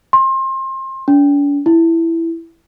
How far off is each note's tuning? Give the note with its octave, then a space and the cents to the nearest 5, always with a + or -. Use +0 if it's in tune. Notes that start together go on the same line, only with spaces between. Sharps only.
C6 +30
D4 -45
E4 +5